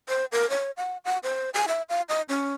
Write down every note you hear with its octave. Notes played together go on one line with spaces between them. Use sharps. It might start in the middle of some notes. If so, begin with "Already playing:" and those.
C5
A#4
C#5
F#5
F#5
C5
G#5
E5
F5
D#5
C#4